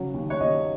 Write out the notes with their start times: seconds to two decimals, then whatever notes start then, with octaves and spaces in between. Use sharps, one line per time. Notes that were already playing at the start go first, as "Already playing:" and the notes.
Already playing: C#3 F#3
0.14 D#2
0.30 C#5
0.40 D#2 D#5